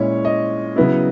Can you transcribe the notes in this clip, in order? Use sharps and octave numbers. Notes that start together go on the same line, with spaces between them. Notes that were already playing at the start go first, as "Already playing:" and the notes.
Already playing: A#2 G#3 C#4 E4 C#5
D#5
C#3 F#3 B3 E4